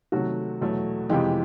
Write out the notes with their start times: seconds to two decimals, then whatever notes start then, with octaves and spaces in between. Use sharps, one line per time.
0.12 C3 D#3 F#3 A3 F#4
0.61 E2 B2 F#3 A3
1.09 F2 C3 E3 G#3 G4